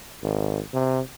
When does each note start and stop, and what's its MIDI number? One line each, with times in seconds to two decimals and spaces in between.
0.23 0.60 32
0.74 1.00 48